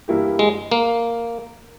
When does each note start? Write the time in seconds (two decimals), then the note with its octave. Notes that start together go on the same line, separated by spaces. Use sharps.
0.08 G2 E3 A#3 E4 G4
0.39 G#3
0.72 A#3